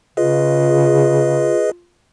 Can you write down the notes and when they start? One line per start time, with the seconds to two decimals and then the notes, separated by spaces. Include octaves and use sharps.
0.17 C#3 F4 G#4 B4 D#5